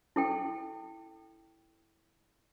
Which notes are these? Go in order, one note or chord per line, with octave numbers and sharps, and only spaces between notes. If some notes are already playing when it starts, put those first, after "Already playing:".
E4 A4 G5